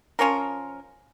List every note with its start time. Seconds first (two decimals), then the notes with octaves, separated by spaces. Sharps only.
0.19 F3 C#4 F4 A#4